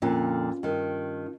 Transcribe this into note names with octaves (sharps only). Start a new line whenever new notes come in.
F2 A#2 D3 C#4 F4
G2 D#3